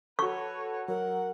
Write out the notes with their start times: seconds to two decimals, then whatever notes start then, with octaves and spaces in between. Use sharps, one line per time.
0.19 F#4 A4 B4 C#5 C#6
0.88 F#3 A#4 F#5